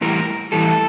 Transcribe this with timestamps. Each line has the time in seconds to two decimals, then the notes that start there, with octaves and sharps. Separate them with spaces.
0.01 A2 E3 G3 A#4
0.52 A2 E3 G3 A4